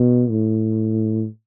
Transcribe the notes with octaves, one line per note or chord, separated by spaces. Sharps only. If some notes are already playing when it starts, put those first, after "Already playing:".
Already playing: B2
A2